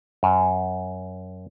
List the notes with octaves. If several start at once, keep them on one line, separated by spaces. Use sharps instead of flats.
F#2